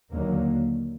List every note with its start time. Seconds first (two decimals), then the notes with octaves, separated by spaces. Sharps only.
0.12 D#2 D3 F#3 A#3